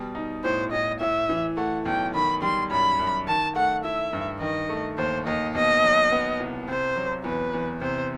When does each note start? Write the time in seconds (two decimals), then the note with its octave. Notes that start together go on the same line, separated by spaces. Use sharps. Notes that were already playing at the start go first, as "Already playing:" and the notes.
Already playing: B2 G3
0.15 D#4
0.44 A2 C5
0.72 A2 D#5
1.00 A2 E5
1.29 E3
1.57 A3 F#5
1.85 B1 G5
2.14 D#3 B5
2.42 G3 C6
2.71 F#2 B5
2.99 F#2
3.27 D#3 A5
3.55 A3 F#5
3.84 E4 E5
4.13 G2
4.40 D#3 D#5
4.69 A3
4.98 D#2 C5
5.27 D#2 D#5
5.54 B2 D#5
5.82 F#3
6.11 B3
6.40 C2
6.68 C3 C5
6.96 F#3
7.24 E2 B4
7.54 E2
7.81 C3 C5